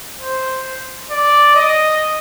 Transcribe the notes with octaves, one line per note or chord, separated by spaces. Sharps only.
C5
D5
D#5